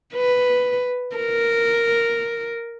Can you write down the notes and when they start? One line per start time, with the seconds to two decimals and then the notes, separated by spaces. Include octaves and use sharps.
0.14 B4
1.16 A#4